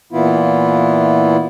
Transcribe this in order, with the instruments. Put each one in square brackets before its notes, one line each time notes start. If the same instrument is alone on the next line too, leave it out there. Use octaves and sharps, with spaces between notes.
[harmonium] A#2 E3 B3 E4 F4